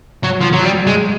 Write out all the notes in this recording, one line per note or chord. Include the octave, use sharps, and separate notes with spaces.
F#3
F3
F#3
G3
G#3